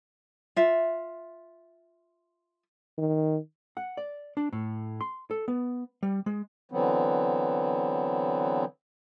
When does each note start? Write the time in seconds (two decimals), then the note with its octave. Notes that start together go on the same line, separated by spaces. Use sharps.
0.56 F4 E5
2.98 D#3
3.77 F#5
3.97 D5
4.37 D4
4.53 A2
5.01 C6
5.31 A4
5.48 B3
6.03 G3
6.26 G#3
6.71 D3 E3 F#3 B3 C4